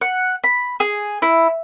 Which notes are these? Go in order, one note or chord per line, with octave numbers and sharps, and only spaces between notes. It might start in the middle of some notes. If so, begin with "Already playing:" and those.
F#5
B5
G#4
E4